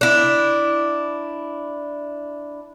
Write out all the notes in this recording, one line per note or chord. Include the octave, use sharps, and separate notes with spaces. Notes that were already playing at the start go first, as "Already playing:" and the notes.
D4 E4